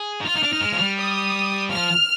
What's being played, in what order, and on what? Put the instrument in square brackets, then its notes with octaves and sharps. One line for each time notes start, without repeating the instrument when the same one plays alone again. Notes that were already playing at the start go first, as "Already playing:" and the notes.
Already playing: [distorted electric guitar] G#4
D#4
[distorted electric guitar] F4 [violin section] F6
[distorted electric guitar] D#4
D4
D#4
G#3
F3
G3
[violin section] D#6
[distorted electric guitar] F3 [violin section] F6